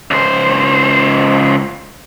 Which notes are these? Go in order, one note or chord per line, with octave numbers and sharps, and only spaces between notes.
C#2 C5